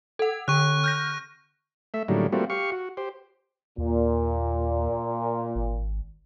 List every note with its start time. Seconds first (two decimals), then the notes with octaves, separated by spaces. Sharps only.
0.19 A4 F#5
0.48 D3 C#6 F#6
0.84 F6 G6 A#6
1.94 A3 E5
2.08 A2 D3 D#3 F#3 G3 A#3
2.32 G3 A3 A#3 C4 F4 F#4
2.50 G4 F5 C#6
2.72 F#4
2.97 G4 C5
3.78 D#2 A#2
5.56 G#1